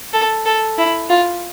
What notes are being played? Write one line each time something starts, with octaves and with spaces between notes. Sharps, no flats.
A4
A4
E4
F4